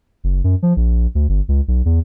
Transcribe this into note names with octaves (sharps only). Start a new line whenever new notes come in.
F#1
F#2
F3
A#1
D2
G1
C#2
B1
E2